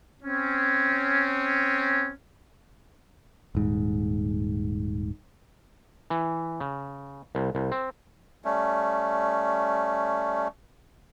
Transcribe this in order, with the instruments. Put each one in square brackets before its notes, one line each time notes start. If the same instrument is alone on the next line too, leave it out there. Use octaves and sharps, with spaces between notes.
[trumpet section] C4 C#4
[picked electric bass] D#1 G#2
[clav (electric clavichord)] E3
C#3
C2
C2
C4
[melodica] G3 A3 C#4